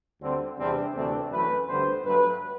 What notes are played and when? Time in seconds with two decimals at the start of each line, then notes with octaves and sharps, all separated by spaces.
0.21 D2 D3 G3 C4
0.57 E2 C3 G3 C4 D4
0.95 D2 C3 E3 A3 C4 D4
1.31 F#2 E3 A3 B4
1.68 D2 D3 G3 B3 C5
2.05 G2 F#3 A3 B4